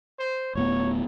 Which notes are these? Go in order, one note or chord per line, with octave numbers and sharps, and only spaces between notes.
C5
D1 A2 B3 C#5